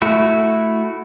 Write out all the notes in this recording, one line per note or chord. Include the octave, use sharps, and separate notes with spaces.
A3 E4 F#4